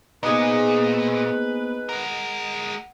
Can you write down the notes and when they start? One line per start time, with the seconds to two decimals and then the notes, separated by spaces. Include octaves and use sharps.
0.23 A#2 A#3 B3 D#4 G#4 B4 C5
1.89 G#3 A#4 F#5